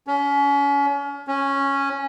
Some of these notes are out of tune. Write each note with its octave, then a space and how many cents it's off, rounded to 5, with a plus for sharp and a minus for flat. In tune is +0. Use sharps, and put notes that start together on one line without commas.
C#4 +35
C#4 -5